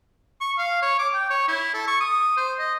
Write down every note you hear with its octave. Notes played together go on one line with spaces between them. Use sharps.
C#6
F5
C#5
D6
G5
C#5
E4
A4
C#6
D#6
C5
D#5